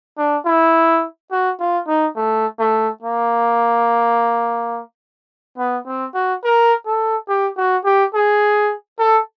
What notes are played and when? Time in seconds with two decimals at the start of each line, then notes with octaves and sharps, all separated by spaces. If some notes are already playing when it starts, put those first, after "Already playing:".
0.18 D4
0.46 E4
1.32 F#4
1.60 F4
1.88 D#4
2.16 A3
2.59 A3
3.02 A#3
5.58 B3
5.86 C4
6.14 F#4
6.44 A#4
6.86 A4
7.29 G4
7.57 F#4
7.85 G4
8.14 G#4
8.99 A4